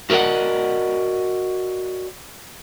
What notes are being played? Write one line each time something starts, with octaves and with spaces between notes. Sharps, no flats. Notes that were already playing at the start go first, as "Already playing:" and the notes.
F#4 A#4 D5 D#5 F#5